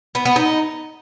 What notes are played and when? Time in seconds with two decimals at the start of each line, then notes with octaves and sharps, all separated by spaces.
0.15 B3
0.25 B3
0.36 D#4